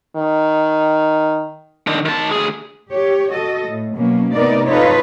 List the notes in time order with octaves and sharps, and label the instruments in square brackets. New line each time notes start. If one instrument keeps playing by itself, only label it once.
[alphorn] D#3
[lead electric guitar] D#3 D4
D#3 A5
D2 G#4
[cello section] G4 C#5
F#4 A4 D#5
A2
B2 F#3 A#3 C#4
C3 A3 B3 D#4 A#4 D5
D#4 F4 A4 B4 C#5